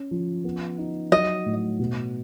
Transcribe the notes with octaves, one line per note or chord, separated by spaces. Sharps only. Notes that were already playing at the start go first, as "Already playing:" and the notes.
Already playing: C#4
F3
B3
D#4
F#3 D#5
A2
B2